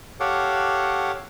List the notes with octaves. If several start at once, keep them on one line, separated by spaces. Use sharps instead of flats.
G4 A4 C#5 F5 F#5 D6